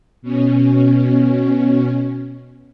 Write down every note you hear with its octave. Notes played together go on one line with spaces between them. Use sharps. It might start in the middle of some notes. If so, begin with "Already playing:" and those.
B2 C#4